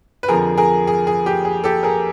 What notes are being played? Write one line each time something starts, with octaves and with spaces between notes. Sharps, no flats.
B4
F2 D3 F3 G#4 A#4
G#4 A#4
G#4
G#4
G4
G#4
G4 A4
G#4 A#4